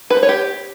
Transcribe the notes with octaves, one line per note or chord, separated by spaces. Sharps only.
B4
C5
C#5
G4